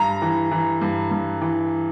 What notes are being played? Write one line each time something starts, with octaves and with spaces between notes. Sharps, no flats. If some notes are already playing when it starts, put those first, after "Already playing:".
Already playing: G2 A#5
E3
E3
G2
G2
E3